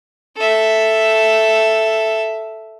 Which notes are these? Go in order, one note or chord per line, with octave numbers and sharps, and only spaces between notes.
A4 E5